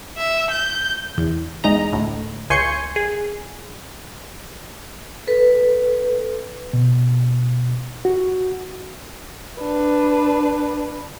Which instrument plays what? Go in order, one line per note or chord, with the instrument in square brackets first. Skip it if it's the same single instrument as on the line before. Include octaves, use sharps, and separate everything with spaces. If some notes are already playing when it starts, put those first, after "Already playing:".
[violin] E5
G6
[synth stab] E2
E2 G#3 D#4 D#5 A#5
D2 A2
C#2 G#5 C6 C#6 G6 C#7
G#4
[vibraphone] A4 B4
[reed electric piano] B2
F#4
[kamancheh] D4 B4